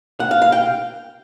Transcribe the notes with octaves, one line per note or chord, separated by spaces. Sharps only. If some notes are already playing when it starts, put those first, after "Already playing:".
F#5
F5
F5
G5